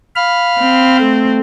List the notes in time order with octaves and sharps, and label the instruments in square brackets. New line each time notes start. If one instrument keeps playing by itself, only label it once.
[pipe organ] F5 B5 F6
[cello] C4
[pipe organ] A3